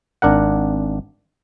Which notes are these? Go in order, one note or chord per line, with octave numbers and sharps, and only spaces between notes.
G#1 D4 A#4 F#5